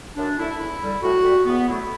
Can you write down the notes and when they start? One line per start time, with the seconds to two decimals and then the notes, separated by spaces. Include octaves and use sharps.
0.16 F#2 D4
0.38 D3 A3 E4
0.59 E2 E4
0.81 D3 G3
1.02 A2 F#4
1.24 G3
1.46 E2 B3
1.67 D3 F#3 A3 E4